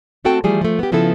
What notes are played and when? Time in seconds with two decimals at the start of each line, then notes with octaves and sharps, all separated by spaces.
0.25 A3 C4 F#4 A4 G5 A5
0.44 E3 F3 G3 A3 F4 G#4
0.61 F3 A3
0.79 B3 G4
0.92 C#3 F3 B3 E4 A4